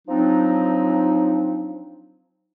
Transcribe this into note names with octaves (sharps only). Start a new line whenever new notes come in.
F3 F#3 C4 D4 D#4